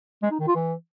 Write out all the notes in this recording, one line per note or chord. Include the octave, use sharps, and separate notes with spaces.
G#3
D#4
D#3
F4
E3